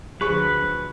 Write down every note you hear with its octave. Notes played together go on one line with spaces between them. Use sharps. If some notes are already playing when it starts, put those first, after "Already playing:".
D2 F3 F#3 G#4 B4 C#6